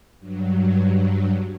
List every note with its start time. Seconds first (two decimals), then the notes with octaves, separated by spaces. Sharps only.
0.19 G2 F#3